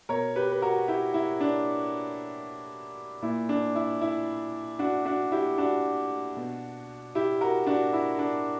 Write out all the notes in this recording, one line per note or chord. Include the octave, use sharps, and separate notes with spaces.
B2 A#4 C#5
G4 B4
B4
F#4 A#4
E4 G4
E4
D4
A#2 E4
D4
E4
E4
D4 F#4
D4 F#4
E4 G4
D4 F#4
B2
E4 G4
F#4 A#4
D4 F#4
E4
D4